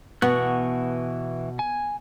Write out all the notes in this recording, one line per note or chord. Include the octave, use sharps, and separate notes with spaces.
B2 E3 B3 C#6 F#6
G#5